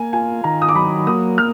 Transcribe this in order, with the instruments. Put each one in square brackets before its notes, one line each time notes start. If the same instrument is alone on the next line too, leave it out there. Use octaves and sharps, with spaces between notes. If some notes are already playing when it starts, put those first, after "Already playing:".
Already playing: [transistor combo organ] A#3 [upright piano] G#5
[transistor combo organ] F4 [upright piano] G#5
[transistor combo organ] D#3 [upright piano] A#5
[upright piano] D#6
D6
[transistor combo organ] F#3 [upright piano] B5
[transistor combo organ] A#3 [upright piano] D#6
[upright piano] F6